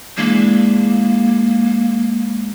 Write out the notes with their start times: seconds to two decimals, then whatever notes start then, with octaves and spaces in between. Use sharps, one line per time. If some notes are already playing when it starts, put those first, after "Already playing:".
0.17 E3 G#3 A#3 D4